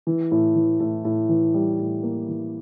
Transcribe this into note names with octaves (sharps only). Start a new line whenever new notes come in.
E3
A2
E3
A2
A2
E3
G3
A2
A#3
E3